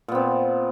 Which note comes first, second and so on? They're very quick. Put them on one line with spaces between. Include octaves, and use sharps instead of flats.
A#2 B3 C4